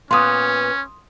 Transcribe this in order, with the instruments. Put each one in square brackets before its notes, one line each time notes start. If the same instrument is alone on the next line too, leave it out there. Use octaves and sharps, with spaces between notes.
[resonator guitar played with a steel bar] A#2 B3 [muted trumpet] C#4 [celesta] C6 D#6